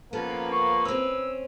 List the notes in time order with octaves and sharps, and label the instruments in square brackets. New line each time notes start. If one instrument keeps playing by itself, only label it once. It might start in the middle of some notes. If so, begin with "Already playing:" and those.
[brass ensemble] F3 A#3 [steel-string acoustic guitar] B3 A4 [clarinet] C#4 [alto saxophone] B4
[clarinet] C#6
[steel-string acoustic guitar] C4 C#4 [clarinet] E6